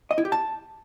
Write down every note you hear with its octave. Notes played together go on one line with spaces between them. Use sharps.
D#5
E4
G4
A5